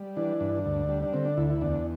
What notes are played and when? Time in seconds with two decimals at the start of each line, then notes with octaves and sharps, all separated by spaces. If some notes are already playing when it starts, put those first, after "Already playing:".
Already playing: G3
0.17 E3 D4
0.41 G2
0.65 D2
0.89 G3
1.03 D4
1.13 D3 C4
1.25 D4
1.37 D2 E4
1.50 E4
1.61 E2 D4